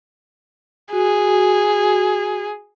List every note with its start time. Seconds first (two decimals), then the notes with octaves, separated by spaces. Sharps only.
0.93 F#4 G#4